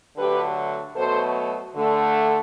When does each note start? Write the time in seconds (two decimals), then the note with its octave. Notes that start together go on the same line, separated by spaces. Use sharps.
0.17 D3 F#3 A3 G4 B4
0.96 B2 F#3 A3 A4 C5
1.75 D3 A3